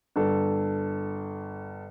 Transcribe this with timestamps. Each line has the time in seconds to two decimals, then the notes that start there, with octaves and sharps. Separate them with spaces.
0.16 G1 A4